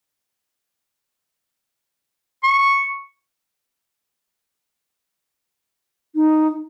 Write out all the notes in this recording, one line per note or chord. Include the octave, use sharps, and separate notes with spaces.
C#6
D#4